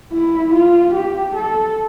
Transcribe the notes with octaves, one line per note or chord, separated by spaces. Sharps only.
E4
F4
G4
A4